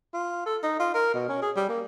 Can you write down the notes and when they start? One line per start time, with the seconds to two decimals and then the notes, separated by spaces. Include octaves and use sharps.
0.14 F4
0.46 A4
0.63 D#4
0.79 F4
0.94 A#4
1.14 B2
1.29 C#4
1.42 G#4
1.56 G3
1.69 A#3